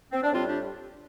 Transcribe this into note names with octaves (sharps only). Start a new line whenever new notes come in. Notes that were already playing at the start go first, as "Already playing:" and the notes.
C4
D4
A2 G3 C4 F4
D4 G4